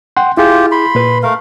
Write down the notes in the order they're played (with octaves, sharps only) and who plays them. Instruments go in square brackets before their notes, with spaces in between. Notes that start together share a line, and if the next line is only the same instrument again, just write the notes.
[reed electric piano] F#5 G5 C6
[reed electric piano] E4 G#4 [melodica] F4 G4
[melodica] B5 C6
[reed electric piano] A#2 B4
[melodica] A3 A#4 F5